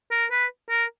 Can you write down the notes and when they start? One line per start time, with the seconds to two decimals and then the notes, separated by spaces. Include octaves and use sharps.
0.11 A#4
0.31 B4
0.70 A#4